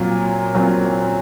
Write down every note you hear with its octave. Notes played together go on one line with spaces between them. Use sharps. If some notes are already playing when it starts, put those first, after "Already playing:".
Already playing: A#2 F#3 C4 F4
A#2 F#3 C4 F4